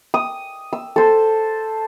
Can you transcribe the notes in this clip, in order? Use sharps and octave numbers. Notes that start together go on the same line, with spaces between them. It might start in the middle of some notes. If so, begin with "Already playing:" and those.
D#6
E6
A4 C5